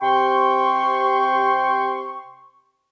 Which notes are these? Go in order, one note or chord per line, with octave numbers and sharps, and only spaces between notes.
C3 G5 C6 C#6